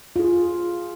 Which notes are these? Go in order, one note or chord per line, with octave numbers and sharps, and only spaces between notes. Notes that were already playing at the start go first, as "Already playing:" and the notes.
F4 G#4